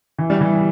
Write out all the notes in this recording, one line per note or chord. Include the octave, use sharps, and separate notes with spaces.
E3
G3
E3